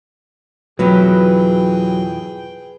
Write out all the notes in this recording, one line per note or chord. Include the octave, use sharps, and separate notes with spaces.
F2 B2 E3 F#3 G#4 B4 G5